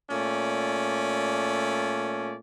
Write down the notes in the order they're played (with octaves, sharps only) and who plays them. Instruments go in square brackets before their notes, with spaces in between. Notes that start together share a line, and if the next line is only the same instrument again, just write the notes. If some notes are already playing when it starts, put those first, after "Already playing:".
[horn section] A#2 A3 C#4 D5